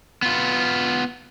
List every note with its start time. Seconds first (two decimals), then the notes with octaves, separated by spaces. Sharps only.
0.22 B3 F4